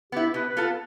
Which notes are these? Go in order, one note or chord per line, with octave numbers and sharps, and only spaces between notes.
B3 E4 G4
B2 B4
B4
B3 F4 A4